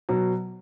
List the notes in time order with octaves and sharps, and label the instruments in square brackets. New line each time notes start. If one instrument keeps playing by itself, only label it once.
[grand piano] B2 F#3